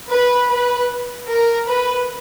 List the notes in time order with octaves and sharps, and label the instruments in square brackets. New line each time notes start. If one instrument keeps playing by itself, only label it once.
[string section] B4
B4
A#4
B4